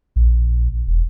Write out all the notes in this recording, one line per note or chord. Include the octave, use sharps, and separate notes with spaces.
A#1
E1